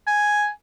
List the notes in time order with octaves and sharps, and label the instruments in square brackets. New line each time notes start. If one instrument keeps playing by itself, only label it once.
[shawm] G#5